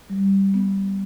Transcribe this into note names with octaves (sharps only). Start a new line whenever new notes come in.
G3
B3